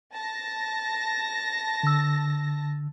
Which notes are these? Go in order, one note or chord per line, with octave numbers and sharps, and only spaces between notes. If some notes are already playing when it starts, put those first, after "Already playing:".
A5 A#6
D3 E6